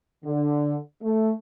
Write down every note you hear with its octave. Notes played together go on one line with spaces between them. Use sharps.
D3
A3